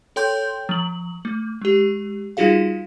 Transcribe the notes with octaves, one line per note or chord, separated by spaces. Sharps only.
A4 C#5 G5 C6 G6
F3 F#7
A3
G#3 G4
G3 D#4 F4 F#4 G#4 F5